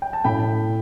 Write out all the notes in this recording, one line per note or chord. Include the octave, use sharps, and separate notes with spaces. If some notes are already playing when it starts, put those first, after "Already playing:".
G5
A5
A2 G5 B5